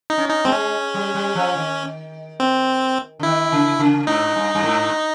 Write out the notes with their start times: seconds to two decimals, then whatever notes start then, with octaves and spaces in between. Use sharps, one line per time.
0.10 D#4
0.18 C#4
0.30 D#4
0.45 G#3 C4
0.52 C#4
0.94 G3
1.14 G3
1.35 F3
1.56 D#3
2.40 C4
3.20 D3
3.23 D#3 E4
3.52 C#3
3.79 C#3
4.07 G#2 D#4
4.36 G2
4.55 G2
4.63 G#2